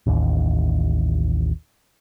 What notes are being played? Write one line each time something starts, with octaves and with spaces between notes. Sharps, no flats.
A1 D#2